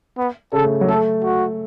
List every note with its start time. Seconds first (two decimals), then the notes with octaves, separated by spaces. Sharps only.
0.17 B3
0.53 C#3 A4
0.64 A3
0.81 F#3
0.88 A3 A4
1.24 F#4